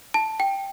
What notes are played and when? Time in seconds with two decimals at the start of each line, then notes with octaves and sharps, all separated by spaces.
0.14 A5
0.40 G5